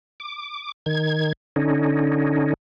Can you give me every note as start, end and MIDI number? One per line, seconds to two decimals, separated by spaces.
0.20 0.72 86
0.86 1.33 51
0.86 1.33 92
1.56 2.54 50
1.56 2.54 61
1.56 2.54 63